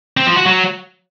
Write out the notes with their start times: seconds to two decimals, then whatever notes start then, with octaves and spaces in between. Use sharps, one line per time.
0.17 C4
0.27 F3
0.36 F#4
0.46 F#3